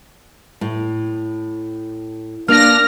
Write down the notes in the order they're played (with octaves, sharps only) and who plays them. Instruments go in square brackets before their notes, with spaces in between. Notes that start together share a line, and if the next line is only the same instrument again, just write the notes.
[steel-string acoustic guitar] A2
[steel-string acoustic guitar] A#3 F4 D5 [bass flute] D4 [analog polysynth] F6 A#6